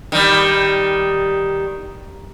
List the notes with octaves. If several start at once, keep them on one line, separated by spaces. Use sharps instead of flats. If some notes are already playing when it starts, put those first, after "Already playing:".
D#3 G3